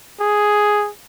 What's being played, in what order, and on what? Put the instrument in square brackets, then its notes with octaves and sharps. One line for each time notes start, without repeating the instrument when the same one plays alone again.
[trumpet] G#4